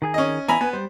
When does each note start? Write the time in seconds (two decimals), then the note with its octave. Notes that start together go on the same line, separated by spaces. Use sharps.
0.02 D#3 G#4 G#5
0.14 C#4 D#5
0.48 E3 B3 E4 G#5 A#5 B5
0.61 B3 G#5
0.73 G3 C5